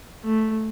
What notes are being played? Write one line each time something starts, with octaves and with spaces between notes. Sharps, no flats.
A3